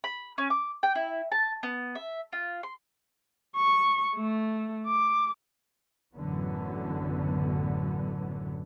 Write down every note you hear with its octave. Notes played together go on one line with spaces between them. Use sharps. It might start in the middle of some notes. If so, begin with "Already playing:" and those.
B5
C#4
D6
G5
E4
A5
B3
E5
F4
C6
C#6
A3
D6
A1 F#2 D3 E3 F#3 B3